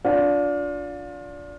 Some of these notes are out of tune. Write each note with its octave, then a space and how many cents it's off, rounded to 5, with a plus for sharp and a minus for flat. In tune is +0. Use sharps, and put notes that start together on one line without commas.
D4 -20 F4 +30